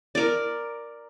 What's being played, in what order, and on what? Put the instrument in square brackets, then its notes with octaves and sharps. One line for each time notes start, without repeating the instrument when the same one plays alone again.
[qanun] A#4 D5